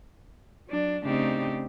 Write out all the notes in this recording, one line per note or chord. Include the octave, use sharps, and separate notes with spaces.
F#3 D4
C#3 A3 C4 D4 D#4 G4